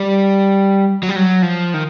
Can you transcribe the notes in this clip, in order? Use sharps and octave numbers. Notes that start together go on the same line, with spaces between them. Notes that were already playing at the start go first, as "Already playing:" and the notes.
Already playing: G3
F#3
G3
F#3
F3
D#3